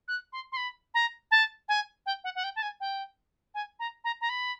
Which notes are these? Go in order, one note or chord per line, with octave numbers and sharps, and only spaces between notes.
F#6
C6
C6
B5
A#5
A5
G#5
G5
F#5
F#5
G5
A5
G#5
G5
G#5
A#5
A#5
A#5
B5